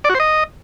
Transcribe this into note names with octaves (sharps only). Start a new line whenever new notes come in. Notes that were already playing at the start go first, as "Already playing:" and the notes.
D5
F#4
C5
D#5